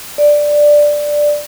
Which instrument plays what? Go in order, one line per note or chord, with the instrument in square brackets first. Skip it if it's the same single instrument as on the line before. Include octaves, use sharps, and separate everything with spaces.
[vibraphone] D5